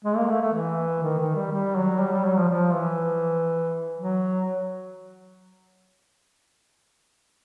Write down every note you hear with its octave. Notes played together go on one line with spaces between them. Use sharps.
G#3
A#3
A3
A3
E3
D#3
D#3
G3
G3
F#3
G3
G3
F#3
F3
F3
E3
F#3